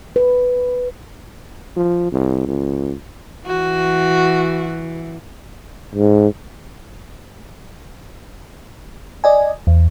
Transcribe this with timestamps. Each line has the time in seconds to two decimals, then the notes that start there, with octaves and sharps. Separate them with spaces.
0.16 B4
1.77 F3
2.12 C2
2.47 C#2
3.47 E3 F#4
5.95 G#2
9.24 D5 D#5 G#5
9.67 E2